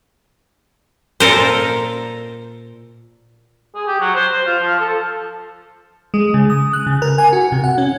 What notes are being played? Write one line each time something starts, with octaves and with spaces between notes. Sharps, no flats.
A#2 A4 A#4 C5
G#4
G4
F#3
C5
C5
F4
F3
A4
G#3
C#3
D#6
F#6
C#3
A#4
G#5
F#4
C3
F#5
C#4